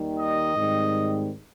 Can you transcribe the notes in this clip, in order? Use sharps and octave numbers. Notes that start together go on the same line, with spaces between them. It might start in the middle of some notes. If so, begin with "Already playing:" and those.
Already playing: D#2 D#3 G3
D#5
G#2 D#3 G3 C4